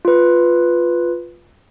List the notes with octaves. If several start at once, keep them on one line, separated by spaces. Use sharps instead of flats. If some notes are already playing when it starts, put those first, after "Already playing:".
F4 B4